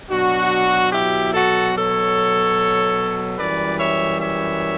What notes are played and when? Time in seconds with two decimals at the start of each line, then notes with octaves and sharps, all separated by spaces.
0.10 B2 F#3 D4 F#4
0.93 E4 G4
1.33 F#4 A4
1.75 A4 C#5
3.39 F#2 E3 G3 B4 D5
3.80 C#5 E5
4.21 C#5 E5